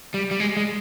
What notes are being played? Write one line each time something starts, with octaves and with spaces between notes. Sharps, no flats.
G3
G3
G#3
G#3